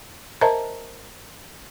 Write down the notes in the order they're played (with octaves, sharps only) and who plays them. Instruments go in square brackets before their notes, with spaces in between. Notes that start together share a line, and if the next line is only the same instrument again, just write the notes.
[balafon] A#4 C5 D#5 E5 A5 A#5